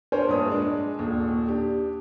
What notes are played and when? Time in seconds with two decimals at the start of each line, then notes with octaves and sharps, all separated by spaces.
0.12 B3 D4 A#4 C5 C#5 G#5
0.28 A#1 G2 D#6
0.48 G#3 D4
0.99 D#1 D#2
1.48 D4 G4